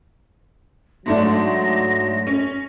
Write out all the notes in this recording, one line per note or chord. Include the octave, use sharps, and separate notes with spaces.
G#2 F#3 A3 D4 A#6
C#4